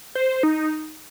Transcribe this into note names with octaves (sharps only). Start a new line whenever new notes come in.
C5
D#4